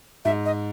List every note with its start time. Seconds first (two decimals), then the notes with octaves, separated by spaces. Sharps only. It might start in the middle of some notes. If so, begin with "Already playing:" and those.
0.25 G#2 E5
0.45 D#5